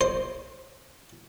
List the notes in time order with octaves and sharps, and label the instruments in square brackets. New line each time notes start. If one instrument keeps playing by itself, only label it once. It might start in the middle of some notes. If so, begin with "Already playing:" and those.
[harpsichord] C5